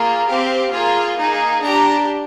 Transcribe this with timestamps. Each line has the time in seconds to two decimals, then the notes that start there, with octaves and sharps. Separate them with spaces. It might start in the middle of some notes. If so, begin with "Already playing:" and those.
Already playing: A#3 F4 G#4
0.28 C4 G4 F5
0.72 A#3 F4 G#4
1.17 A#3 D#4 G#4
1.61 D4 G4 A#5